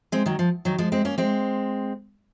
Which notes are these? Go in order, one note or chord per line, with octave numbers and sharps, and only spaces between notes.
G#3 C4
D#3 F#3
F3
D#3 F#3
F3 G#3
G#3 C4
A#3 C#4
G#3 C4